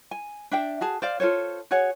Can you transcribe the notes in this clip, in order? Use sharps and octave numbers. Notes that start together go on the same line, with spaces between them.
G#5
D4 E5 G5
F#4 G#4 A5
C5 D5 F5
F4 A4 C5 C#5
F#4 G#4 C#5 F#5